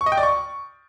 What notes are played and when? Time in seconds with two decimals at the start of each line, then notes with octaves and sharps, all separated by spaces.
0.01 C#6
0.06 D#5
0.12 G5
0.17 D5
0.23 C#6